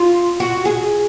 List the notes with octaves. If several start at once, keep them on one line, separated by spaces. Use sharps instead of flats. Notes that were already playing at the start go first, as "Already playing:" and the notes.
Already playing: F4
F#4
G#4